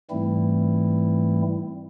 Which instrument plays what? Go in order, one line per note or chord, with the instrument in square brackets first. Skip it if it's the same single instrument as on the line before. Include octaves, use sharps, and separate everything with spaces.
[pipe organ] G#2 E3 G3 A3 C4 E4